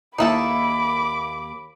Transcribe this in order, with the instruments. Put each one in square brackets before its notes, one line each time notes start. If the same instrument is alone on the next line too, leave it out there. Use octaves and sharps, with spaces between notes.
[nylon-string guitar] D#2 A#3 A5 [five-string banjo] D#4 E4 A4 [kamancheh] B5 D6